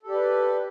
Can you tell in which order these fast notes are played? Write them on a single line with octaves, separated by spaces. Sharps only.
A4 G4 D5 B4